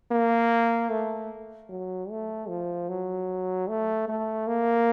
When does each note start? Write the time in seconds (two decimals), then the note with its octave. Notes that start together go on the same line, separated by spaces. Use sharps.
0.11 A#3
0.91 A3
1.70 F#3
2.10 A3
2.49 F3
2.89 F#3
3.69 A3
4.08 A3
4.47 A#3